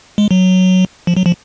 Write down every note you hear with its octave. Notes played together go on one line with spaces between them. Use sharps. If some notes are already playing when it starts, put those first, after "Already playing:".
G#3
F#3
F3
F#3
F3